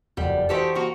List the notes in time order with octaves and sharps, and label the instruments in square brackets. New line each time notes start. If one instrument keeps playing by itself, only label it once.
[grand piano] F#1 F2 F#5 [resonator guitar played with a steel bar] G3
[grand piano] E3 C5 D#5 [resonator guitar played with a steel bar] F#4 G4 A4
[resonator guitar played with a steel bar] A#3 F#4